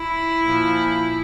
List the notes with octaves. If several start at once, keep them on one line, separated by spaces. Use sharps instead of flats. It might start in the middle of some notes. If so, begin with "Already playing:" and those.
Already playing: E4
A#2 F3